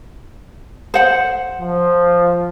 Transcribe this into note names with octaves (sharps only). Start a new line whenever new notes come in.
C5 F#5
F3